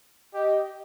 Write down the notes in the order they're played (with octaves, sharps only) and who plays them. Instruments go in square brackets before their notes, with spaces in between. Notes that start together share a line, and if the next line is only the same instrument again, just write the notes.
[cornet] G4 [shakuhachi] D#5